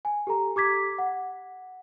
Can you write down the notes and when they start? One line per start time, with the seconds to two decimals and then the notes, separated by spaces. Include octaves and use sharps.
0.05 G#5
0.27 G4 A4 A#5
0.56 G4 D6 G#6 B6
0.98 F#5